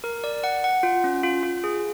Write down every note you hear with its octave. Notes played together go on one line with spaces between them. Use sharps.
A#4
D5
F#5
F#5
F4
C#4
F4
F4
G#4